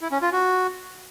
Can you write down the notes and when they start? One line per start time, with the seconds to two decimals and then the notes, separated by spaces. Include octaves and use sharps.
0.01 E4
0.11 C#4
0.22 F4
0.32 F#4